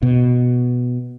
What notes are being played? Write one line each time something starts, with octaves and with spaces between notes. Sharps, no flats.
B2